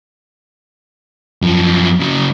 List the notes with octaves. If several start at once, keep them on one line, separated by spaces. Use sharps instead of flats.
F#2 F3
C#3 F#3